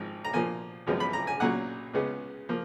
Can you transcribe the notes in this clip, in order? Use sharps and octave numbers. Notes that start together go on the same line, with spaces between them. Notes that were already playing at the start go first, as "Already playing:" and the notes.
Already playing: G#1 G#2 F3
A#5
A#2 F3 A#3 G#5
G#1 F#2 F3 G#3 B3
B5
A#5
G#5
B1 A#2 F#3 C#4 F#5
C#2 C#3 G#3 B3
F3 A#3